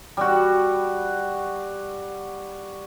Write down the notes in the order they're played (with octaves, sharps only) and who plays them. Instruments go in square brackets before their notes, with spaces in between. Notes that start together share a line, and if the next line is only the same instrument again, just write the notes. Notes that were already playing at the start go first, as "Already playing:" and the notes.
[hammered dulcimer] G3 F#4